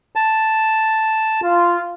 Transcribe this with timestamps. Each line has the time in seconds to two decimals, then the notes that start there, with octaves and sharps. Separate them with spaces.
0.16 A5
1.43 F4